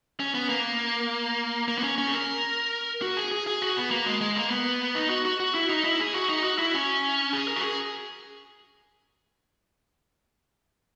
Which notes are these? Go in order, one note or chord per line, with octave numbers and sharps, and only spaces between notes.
C#4
B3
A#3
A#3
B3
C#4
C#4
G#4
A#4
F#4
G#4
G#4
G#4
F#4
B3
A#3
G#3
G#3
A#3
B3
D#4
F#4
F#4
F#4
E4
D#4
E4
G#4
F#4
D#4
F#4
E4
C#4
G#4
A#4
F#4
G#4